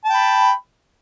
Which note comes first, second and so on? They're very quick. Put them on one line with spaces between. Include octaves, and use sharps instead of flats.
A5 G5 B5